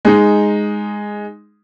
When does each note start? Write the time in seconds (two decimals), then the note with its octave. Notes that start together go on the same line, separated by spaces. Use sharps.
0.05 G#3 D#4